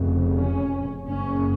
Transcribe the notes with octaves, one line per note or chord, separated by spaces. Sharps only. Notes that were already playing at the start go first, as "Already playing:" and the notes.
Already playing: F1 F2 C#3
C#4
F#1 F#2 C#3 C#4